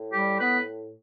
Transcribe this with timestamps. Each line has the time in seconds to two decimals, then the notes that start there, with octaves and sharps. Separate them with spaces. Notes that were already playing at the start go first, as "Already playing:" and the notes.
Already playing: A2
0.13 G3 G4
0.39 B3 B4